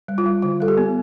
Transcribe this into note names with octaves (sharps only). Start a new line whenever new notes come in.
G3
F4
G3
D3 F4
G3 A4
G4
B3